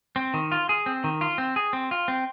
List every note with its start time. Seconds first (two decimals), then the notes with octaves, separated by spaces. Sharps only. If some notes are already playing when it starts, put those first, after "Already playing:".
0.16 C4
0.34 D#3
0.52 F4
0.69 G#4
0.86 C4
1.04 D#3
1.21 F4
1.38 C4
1.56 G#4
1.73 C4
1.91 F4
2.08 C4